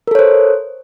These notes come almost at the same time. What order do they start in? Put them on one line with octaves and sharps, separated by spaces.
A#4 A4 C#5 C5